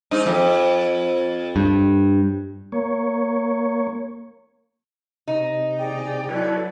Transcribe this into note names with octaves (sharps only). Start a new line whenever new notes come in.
G#2 D#4
F2
G2
A#3 C#5
C3 D#4
G#4 D5 G5
F#3 E4 A4 B4 C#5 D5